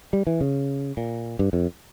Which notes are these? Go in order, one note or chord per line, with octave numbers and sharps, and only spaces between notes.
G3
E3
C#3
A#2
G2
F2